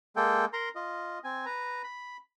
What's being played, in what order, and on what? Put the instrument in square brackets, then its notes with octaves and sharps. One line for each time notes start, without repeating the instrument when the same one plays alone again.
[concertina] G#3 A#3 A4 G5
A#4 A#5 C6
F4 D#5
C4 G#5
B4 A#5
B5